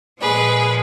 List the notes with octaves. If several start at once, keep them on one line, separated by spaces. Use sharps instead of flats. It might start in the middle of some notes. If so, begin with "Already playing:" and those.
A#2 F3 G#3 G#4 B4